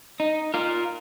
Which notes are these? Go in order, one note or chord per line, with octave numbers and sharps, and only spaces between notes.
D#4
F4 A#4